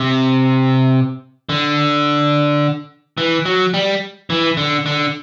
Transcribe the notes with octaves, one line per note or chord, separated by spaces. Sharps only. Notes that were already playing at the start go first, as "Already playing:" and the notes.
Already playing: C3
D3
E3
F#3
G3
E3
D3
D3